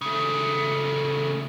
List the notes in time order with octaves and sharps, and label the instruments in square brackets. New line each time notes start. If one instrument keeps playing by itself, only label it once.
[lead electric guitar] C#3 A3